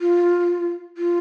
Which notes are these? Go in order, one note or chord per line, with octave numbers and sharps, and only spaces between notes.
F4
F4